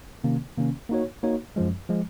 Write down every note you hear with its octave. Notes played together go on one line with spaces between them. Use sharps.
C3 D#3 A#3 C#4
C3 D#3 A#3 C#4
A#3 D#4 F#4 C#5
A#3 D#4 F#4 C#5
F#2 F3 G#3
F3 G#3